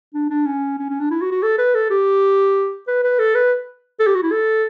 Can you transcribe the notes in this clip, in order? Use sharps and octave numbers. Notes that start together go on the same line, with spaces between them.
D4
D4
C#4
C#4
C#4
D4
E4
F#4
F#4
A4
B4
A4
G4
B4
B4
A4
B4
A4
G4
F#4
E4
A4